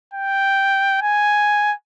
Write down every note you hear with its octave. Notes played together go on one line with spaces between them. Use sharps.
G5
G#5